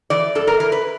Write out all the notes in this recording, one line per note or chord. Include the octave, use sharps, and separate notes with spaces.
E3 D5
G2 A4
A#4
E3 A#4
B4